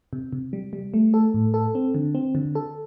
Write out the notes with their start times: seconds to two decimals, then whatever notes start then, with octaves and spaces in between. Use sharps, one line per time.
0.13 C3
0.33 C3
0.53 G3
0.73 G3
0.94 A3
1.14 A4
1.34 A2
1.54 A4
1.75 C4
1.95 D3
2.15 C4
2.35 D3
2.55 A4